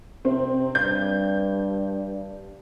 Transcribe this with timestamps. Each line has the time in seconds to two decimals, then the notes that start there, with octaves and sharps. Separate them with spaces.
0.25 C3 C4
0.75 G2 G6